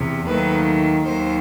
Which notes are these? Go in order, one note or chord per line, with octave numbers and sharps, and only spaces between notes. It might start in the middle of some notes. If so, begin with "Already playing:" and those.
Already playing: E2 C3
D#2 D#3 F#3 A3 B4
D#2 D#3 F#3 C5